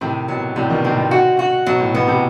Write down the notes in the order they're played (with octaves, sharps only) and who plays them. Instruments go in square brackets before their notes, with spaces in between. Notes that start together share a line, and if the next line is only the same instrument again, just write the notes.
[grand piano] A2 C3 [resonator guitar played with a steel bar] D#3
[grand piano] B2 [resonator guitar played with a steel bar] F#3
[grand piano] A2 C3 [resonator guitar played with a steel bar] G3
[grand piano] B2 D#3
[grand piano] A2 C3 [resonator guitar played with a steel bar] C4
[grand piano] B2
[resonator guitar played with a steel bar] F#4
F#4
[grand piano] B2 [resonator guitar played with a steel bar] F#3
[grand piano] A2
[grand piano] B2 [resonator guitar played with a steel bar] B3
[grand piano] A2 C3